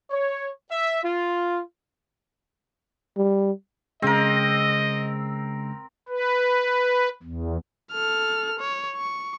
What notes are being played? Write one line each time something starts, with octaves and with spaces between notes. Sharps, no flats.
C#5
E5
F4
G3
C#3 G#3 C4 A#4 D#5
B4
E2
A4 F6
C#5
C#6